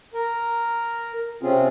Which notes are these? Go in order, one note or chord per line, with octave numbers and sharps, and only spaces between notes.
A#4
C3 C4 C#4 F4 G#4